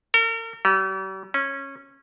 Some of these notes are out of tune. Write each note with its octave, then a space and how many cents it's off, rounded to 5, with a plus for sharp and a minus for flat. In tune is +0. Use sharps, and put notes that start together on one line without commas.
A#4 -40
G3 -45
C#4 -15